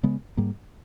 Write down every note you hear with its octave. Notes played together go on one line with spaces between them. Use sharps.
C#3 G#3 B3
G#2 G3 A#3